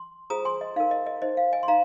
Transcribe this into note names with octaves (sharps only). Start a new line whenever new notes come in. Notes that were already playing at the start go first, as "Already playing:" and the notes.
Already playing: C6
F4 G#4 C5 A#5 D#6
G#5 C6
D#5
D#4 A#4 F5
D#5
D#5
D#4 C5 D#5
F5
D#5 G#5
C6
D#4 F5 A#5